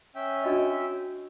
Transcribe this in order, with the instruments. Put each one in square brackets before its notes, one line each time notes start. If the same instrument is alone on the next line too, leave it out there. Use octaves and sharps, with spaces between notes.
[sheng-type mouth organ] C#4 E5 G5
[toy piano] D4 F#4 D#5